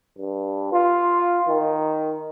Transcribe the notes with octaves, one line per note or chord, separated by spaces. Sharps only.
G2
F4
D#3